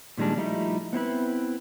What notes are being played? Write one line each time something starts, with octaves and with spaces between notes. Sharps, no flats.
A#2 D#3 G3 G#3 D4
F3 G3 A3 D#4 E4
B3 C4 E4 B4